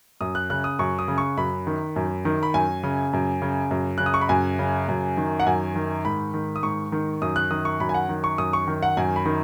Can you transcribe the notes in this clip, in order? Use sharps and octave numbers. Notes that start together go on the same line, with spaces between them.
F#2 D#6
F#6
C#3 F#6
D#6
F#2 C#6
D#6
C#3
C#6
F#2 B5
D#3
F#2
D#3
B5
F#2 G#5
C#3
F#2
C#3
F#2
C#3 F#6
D#6
C#6
B5
F#2 G#5
C#3
F#2
D#3
F#5
F#2 G#5
D#3
G#2 B5
D#3
D#6
G#2 C#6
D#3
F#2 D#6
F#6
D#3 D#6
C#6
F#2 B5
G#5
F#5
D#3
C#6
F#2 D#6
C#6
D#3
F#5
F#2 G#5
B5
D#3